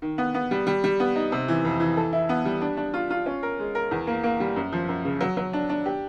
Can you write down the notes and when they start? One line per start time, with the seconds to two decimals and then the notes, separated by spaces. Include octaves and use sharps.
0.02 D#3
0.18 B3
0.34 B3
0.51 G3
0.67 G3
0.84 G3
1.00 B3
1.15 D#4
1.32 C3
1.48 E3
1.65 F2
1.80 E3
1.97 A4
2.13 E4
2.29 B3
2.45 G3
2.61 D4
2.77 D4
2.94 F4
3.10 F4
3.26 C#4
3.43 A#4
3.59 G#3
3.75 A#4
3.91 E2
4.07 A#3
4.23 A#3
4.40 G3
4.56 F#2
4.72 F3
4.88 F#2
5.05 C#3
5.21 F#3
5.37 F#3
5.53 D4
5.69 D4
5.86 G4